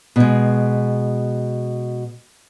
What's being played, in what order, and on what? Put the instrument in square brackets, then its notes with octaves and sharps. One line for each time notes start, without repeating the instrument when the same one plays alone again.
[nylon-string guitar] B2 G#3